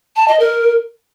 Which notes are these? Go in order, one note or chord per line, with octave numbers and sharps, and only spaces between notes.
A5
D#5
A#4